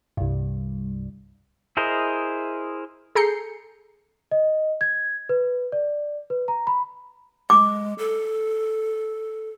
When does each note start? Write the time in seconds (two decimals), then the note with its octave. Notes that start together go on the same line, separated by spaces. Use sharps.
0.17 C2 G2
1.77 E4 G#4 A#4 C5 D#5
3.15 G#4 A4 A#5 G6 C7 C#7
4.31 D#5
4.81 G#6
5.29 B4
5.72 D5
6.30 B4
6.48 A#5
6.67 B5
7.50 G#3 D6
7.98 A4